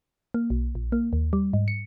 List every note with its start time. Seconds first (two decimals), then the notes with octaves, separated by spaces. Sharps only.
0.34 A#3
0.50 B1
0.75 A#1
0.92 A#3
1.13 D#2
1.33 G3
1.53 G#2
1.68 C#7